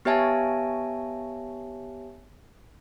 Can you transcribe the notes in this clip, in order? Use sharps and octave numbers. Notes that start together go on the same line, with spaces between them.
B3 G4 C#5 E5 G#5 A5